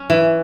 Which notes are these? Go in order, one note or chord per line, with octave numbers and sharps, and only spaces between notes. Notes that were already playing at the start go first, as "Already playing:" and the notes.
Already playing: C#4
E3